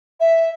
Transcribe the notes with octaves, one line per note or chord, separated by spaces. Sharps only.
E5